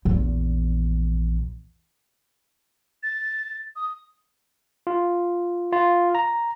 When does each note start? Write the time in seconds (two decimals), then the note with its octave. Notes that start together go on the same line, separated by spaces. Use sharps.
0.05 A#1 E2
3.03 A6
3.76 D#6
4.87 F4
5.73 F4
6.15 A#5